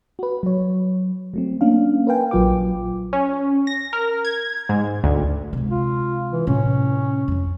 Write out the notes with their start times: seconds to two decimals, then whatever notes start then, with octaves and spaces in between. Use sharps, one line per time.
0.19 F#4 B4
0.43 F#3 C#5
1.34 F#3 A3 C4
1.61 A#3 C#4 D4 F5
2.07 A#4 B4 F5 G5 G#5
2.31 A#1 F#3 F4 B4 G5 D6
3.13 C#4
3.67 A#6
3.93 A#4
4.25 G#6
4.69 G#2
5.04 D2
5.53 C3 G#3
5.70 F4
6.32 E3
6.47 A2 C3 C#4
7.28 F2 F3